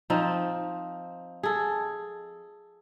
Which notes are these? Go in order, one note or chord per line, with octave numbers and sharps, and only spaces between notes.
F3 C4 D#4
G#4 A4